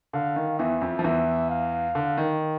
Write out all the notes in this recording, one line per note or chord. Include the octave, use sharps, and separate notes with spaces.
D3 F5
D#3
E2 E3 E5
F2 F3
F3
E2 E3 E5
F5
D3
D#3